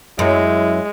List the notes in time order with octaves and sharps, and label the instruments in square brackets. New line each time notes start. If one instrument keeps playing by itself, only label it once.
[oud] F#2 [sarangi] G#3 [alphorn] E4